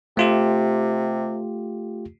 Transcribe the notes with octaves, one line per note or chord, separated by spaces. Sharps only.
C3 A3 F4 G4